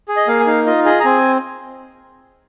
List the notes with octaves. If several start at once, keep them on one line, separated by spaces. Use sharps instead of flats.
G#4
D#5
A#3 F5
G#5
D#4 F5
F4 D#5
G#4 D#5
A#5
C4 G#5